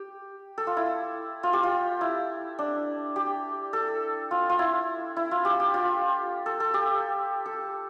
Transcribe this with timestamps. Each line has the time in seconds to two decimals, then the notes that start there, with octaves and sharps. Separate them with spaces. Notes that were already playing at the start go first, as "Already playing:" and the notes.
Already playing: G4
0.58 A4
0.67 F4
0.77 E4
1.43 F4
1.53 G4
1.63 F4
2.01 E4
2.59 D4
3.16 G4
3.73 A4
4.31 F4
4.50 F4
4.59 E4
5.17 E4
5.31 F4
5.45 G4
5.60 G4
5.74 F4
6.46 A4
6.60 A4
6.74 G4
7.46 A4